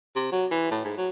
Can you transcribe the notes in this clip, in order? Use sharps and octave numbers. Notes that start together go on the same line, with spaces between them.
C3
F#3
E3
A2
G#2
F#3